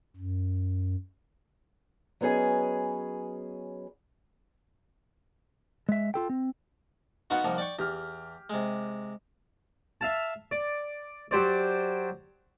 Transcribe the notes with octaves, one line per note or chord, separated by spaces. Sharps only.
F#2
F#3 B3 C#4 G#4 D#5
G#3 E5
F4 A4 G5
C4
B3 D#4 F4 F#4 F#5
C2 F3 A#3
D5 G5 C#6
E2 G4 F6
C3 G#3
E5 F5 A5
D5
F#3 G4 C5 D5